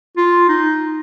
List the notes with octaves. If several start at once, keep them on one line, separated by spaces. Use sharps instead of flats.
F4
D#4